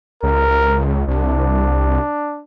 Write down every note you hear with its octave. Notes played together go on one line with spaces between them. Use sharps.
C#2 A#4
C2 D4